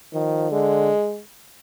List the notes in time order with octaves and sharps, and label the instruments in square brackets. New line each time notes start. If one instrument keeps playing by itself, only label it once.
[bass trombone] D#3 [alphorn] F3
[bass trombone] D3 [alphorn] G#3